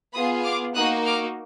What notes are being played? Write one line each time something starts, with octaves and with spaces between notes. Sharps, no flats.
B3 F4 G#4 B5 D#6
D6 F6
A#3 D#4 F#4 D#6 F#6
D6 F6